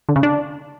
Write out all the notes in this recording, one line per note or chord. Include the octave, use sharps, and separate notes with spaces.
D3
C#3
D4